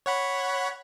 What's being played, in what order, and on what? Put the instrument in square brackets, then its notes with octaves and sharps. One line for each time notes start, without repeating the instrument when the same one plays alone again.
[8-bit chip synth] C#5 F#5 B5